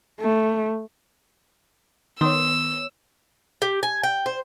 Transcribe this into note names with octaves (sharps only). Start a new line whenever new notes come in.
A3
D#3 B3 C#5 C6 D#6 E6 E7
G4
G#5
G5
C5